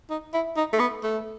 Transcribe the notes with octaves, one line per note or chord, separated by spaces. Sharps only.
D#4
E4
D#4
A3
B3
A3